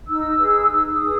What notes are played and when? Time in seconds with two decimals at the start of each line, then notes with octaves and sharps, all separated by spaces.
0.08 D#4 E6
0.39 G#4 B4
0.71 D#4 E6
0.92 D#6
1.01 G#4 B4